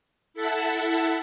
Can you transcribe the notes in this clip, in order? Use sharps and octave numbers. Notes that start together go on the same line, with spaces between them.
E4 A4 E5 F#5 A5